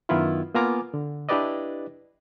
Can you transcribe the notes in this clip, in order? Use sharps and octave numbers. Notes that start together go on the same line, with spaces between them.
F#2 D#3 B3 E4 F4
A#3 B3 F4 G#5 A#5 D6
D3
D4 E4 G4 B4 D5 D#5